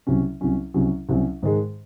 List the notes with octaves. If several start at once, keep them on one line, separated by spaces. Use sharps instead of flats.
C2 C3 F#3 C#4
C2 C3 F#3 C#4
C2 C3 F#3 C#4
C2 C3 F#3 C#4
G#2 D#3 G#3